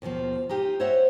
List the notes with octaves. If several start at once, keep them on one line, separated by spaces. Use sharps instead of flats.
D#2 B2 D#3 F3
D#4 F4 G4
C5 C#5 D#5 E5 F#5